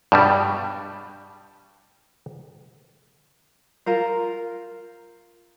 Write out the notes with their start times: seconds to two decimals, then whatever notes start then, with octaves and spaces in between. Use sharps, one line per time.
0.12 G2 B2 G3
3.86 F4 A#4 C5